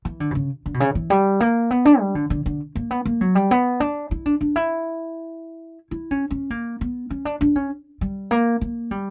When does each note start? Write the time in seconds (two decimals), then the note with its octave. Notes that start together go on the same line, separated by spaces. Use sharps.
0.05 E3
0.20 D3
0.31 B2
0.35 C#3
0.66 D3
0.74 B2
0.80 C#3
0.95 E3
1.10 G3
1.40 A#3
1.71 B3
1.85 D4
2.00 G3
2.15 D3
2.30 D3
2.46 D3
2.75 A#3
2.91 B3
3.05 A#3
3.21 F#3
3.35 G3
3.51 B3
3.80 D4
4.11 E4
4.26 D4
4.41 D4
4.56 E4
5.91 E4
6.11 C#4
6.31 C#4
6.50 A#3
6.81 B3
7.10 C#4
7.25 D4
7.41 D4
7.56 C#4
8.01 G3
8.31 A#3
8.61 A#3
8.91 G3